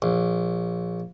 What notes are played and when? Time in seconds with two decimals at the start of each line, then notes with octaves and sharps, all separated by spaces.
0.02 A#1